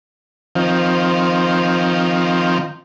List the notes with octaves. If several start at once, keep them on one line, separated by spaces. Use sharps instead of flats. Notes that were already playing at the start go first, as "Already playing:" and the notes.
D#3 F3 C4